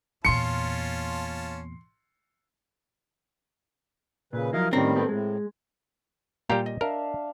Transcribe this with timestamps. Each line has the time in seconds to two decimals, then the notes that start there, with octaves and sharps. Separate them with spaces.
0.25 E2 A#2 C#4 F4 A5 C6 C#7
4.33 A#2 C#3 B4
4.53 F3 F#3 E4 A#4 D#5 F5
4.73 A2 D#3 G3 A3 C4 C#4 A#4
4.96 B3 G4 A4
5.09 A2 G#3
6.50 A#2 G3 G4 F5 A#5
6.66 D#5
6.81 D4 A#4 E5 F5